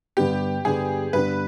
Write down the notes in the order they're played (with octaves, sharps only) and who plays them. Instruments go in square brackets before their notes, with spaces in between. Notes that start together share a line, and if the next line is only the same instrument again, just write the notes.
[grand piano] G2 D3 G3 B3 [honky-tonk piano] G4
[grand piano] G2 D3 G3 B3 [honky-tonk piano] G#4
[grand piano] G2 D3 G3 B3 [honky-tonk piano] B4